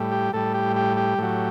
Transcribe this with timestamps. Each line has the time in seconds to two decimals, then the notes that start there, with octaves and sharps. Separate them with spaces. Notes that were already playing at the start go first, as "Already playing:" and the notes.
Already playing: A2 G3
0.12 G4
0.33 A2 G3 A4
0.54 G4
0.76 G4
0.97 G4
1.18 A2 F#3